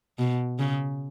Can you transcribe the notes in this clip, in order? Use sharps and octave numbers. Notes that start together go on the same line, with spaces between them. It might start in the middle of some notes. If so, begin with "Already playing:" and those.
B2
C#3